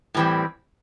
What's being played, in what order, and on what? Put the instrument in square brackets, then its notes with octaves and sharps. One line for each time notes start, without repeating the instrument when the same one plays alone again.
[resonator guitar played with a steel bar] A2 E3 G3 C4